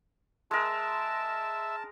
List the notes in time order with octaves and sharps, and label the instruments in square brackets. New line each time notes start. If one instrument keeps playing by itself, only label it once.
[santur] G#3 A#4 [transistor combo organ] E5 [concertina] A5